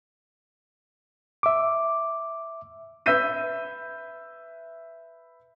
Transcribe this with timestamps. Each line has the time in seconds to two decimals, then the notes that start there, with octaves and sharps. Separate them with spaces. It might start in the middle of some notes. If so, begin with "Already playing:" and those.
1.43 E5 D6
3.06 B4 E5 E6 G6 B6 D#7